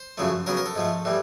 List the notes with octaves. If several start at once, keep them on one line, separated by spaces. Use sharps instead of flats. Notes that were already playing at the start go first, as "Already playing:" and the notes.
Already playing: C5
F#2 C#3 F3 A3
C#3 F#3 B3 A#4
A#4
A4
G#2 F3 A3
A2 E3 G3